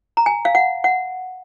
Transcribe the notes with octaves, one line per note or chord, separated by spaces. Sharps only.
A#5
G#5
F5
F#5
F#5